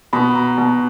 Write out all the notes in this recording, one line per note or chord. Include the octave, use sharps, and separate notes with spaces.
B2 B5
A#5
B2